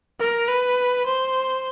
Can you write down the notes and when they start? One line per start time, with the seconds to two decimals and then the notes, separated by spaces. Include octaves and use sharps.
0.20 A#4
0.49 B4
1.06 C5